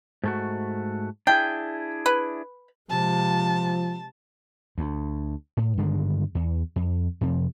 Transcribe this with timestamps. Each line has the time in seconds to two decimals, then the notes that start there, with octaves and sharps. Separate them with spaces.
0.23 G#2 A3 F#4
1.27 D4 E4 G#4 G5
2.06 B4
2.90 C3 F3 G#3 A5
4.78 D2
5.57 A2
5.78 G2 D3 D#3 G#3
6.35 E2
6.76 F2
7.21 F2 C3 F3